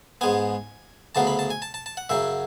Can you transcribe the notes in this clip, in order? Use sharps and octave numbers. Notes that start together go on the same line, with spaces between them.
G#2 G#3 B3 G#5
D2 C#3 F#3 B3 A5
B5
A5
G#5
A5
A5
A5
F#5
F#2 C#3 F#3 E5